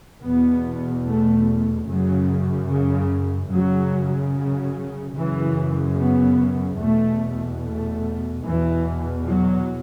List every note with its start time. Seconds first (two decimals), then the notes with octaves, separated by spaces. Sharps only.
0.22 E2 B2 B3
1.05 A3
1.86 F#2 C#3 F#3
2.69 C#3
3.51 F#2 C#3 F#3
4.33 F#3
5.16 F#2 C#3 E3
5.98 B3
6.80 E2 B2 A3
7.62 A3
8.45 E2 B2 E3
9.27 F#3